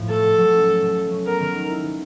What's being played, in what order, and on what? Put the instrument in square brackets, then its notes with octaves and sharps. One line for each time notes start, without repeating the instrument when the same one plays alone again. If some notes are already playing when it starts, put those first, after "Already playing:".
Already playing: [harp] A2 F3
[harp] A3 [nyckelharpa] A4
[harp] B2
F#3
C#4
A3
B2
F#3
C#4
[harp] B3 [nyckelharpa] A#4
[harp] D#3
G#3
E4
B3